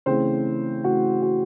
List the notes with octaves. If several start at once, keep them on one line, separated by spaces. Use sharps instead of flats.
C#3 E3 A3 C4 C5
C#3 E3 A3 F#4
F#4